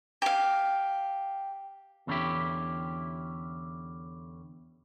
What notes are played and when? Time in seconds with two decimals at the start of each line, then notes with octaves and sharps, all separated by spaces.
0.22 G4 F5
2.07 E2 D3 C#4 D#4 E4 G4